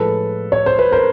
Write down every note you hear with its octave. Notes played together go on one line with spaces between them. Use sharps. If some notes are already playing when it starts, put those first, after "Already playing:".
Already playing: A2 F3 G#3 A4 B4
C#5
C5
B4
A#4 C5